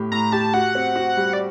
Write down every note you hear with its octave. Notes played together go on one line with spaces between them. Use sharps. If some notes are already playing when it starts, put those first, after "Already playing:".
Already playing: A2 G4
A2 A#5
G4 A5
F#4 F#5
C4
F#4
G3
D5